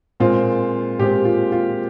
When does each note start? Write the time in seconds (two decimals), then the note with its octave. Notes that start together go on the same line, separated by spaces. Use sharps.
0.20 A#2 G#3 C4 F4
0.99 A#2 G#3 C4 G4
1.25 F4
1.52 F4